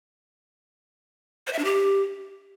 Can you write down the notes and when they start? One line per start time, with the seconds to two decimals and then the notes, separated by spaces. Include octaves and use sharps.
1.47 C5
1.53 E5
1.59 D4
1.64 G4